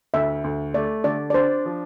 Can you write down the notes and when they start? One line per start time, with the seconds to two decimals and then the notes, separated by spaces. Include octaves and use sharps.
0.14 D2 E5
0.44 D2
0.74 A3 D5
1.04 D3 D5
1.30 D5
1.34 D4 C5
1.65 F3